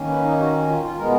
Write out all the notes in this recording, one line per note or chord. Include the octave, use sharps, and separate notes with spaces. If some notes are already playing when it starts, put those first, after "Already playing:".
Already playing: D#3 A#3 C#4
B4
D#4
F#4
F4
F4
B2 G#3 B3 A#4